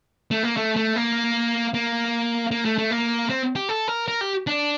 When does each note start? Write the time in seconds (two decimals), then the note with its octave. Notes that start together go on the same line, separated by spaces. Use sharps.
0.31 A3
0.43 A#3
0.57 A3
0.76 A3
0.96 A#3
1.74 A#3
2.51 A#3
2.65 A3
2.78 A3
2.91 A#3
3.30 C4
3.56 G4
3.69 A4
3.88 A#4
4.08 A#4
4.21 G4
4.47 D4